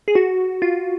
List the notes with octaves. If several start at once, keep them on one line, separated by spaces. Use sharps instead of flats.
G#4
F#4
F4